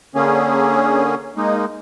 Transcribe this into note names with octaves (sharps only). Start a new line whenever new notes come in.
D3 A#3 C#4 G#4
G#3 A#3 D#4